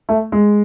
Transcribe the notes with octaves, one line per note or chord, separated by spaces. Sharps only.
A3
G#3